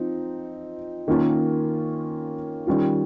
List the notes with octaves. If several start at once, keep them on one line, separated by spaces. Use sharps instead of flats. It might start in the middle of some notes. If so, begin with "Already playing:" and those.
Already playing: F3 C4 D#4
D#3 A#3 C#4 F4
D#3 G3 C#4 F4